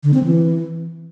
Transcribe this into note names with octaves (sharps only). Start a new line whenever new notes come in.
D3
C4
E3